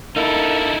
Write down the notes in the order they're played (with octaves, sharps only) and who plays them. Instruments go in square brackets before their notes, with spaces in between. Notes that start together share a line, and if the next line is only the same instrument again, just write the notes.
[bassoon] A#3 [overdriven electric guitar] D#4 E4 [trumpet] A4